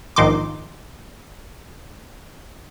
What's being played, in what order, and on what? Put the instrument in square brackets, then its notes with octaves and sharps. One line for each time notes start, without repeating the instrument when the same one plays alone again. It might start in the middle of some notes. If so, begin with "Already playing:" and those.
[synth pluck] A#1 G#2 D#3 C6 D6